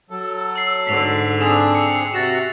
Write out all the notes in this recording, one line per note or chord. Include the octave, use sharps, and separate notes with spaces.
F#3 A4
E6 C7
G#2 D3 B6 C7 F7
C4 D4 G#4 E6 E7 F7
C#7
C3 F#4 F#5 A6 A#6 E7